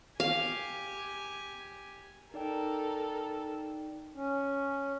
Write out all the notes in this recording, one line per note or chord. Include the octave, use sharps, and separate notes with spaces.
G4 F5 G#5
D#4 A4 A#4 D5 G5
C#4